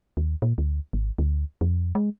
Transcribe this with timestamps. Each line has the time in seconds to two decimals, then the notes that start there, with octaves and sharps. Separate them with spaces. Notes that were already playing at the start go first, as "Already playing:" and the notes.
0.17 D#2
0.42 A#2
0.58 D2
0.93 G#1
1.18 D2
1.61 F2
1.95 G#3